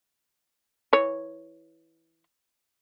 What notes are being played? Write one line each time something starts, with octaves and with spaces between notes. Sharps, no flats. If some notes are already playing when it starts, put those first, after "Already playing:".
E3 C#5